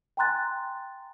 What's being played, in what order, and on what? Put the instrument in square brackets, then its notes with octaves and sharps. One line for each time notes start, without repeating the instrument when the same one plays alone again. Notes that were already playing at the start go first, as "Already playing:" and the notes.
[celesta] G5 G#5 A#5 C6 F#6 A6